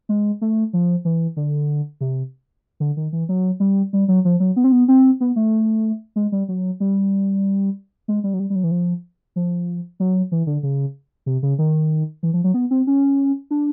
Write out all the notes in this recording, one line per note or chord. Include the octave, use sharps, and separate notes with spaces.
G#3
A3
F3
E3
D3
C3
D3
D#3
E3
F#3
G3
G3
F#3
F3
F#3
B3
C4
B3
C4
B3
A3
G#3
G3
F#3
G3
G#3
G3
F#3
G3
G3
F#3
E3
F3
F3
F#3
E3
D3
C#3
C3
C#3
D#3
E3
F3
F#3
B3
C4
C#4
D4